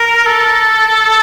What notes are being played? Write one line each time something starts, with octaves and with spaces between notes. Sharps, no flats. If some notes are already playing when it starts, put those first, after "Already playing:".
Already playing: A#4
A4